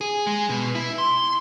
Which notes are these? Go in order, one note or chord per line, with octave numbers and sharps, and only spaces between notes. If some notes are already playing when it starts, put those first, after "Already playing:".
G#4
G#3
B2
E4
C6